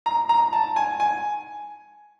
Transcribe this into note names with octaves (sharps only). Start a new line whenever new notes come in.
A#5
A#5
A5
G#5
G#5